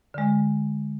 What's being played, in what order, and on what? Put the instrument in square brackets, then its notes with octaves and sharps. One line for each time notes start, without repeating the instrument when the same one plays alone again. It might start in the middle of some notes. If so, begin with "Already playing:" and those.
[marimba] D3 G#3